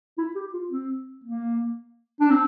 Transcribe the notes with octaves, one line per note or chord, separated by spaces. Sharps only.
E4
G4
F4
C4
A#3
D4
C4